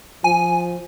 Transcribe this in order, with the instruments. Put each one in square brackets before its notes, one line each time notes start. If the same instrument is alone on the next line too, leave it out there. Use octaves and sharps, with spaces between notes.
[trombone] F3 [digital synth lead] G#5